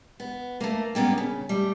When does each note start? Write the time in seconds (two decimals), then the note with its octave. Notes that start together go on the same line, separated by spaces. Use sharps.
0.20 B3
0.60 A3 A#3
0.95 G3 A#3 B3 C#4
1.18 C#3
1.49 G3 A3